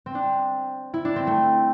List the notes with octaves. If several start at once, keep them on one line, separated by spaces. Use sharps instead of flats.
C4
D4
E4
D4
C4
A3